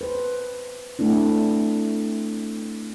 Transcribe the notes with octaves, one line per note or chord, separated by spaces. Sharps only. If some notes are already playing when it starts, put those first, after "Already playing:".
B4 C5
A3 C4 D4 E4